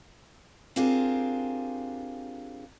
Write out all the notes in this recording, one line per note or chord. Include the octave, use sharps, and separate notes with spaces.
C4 D4 F4 G4 G#4 A#4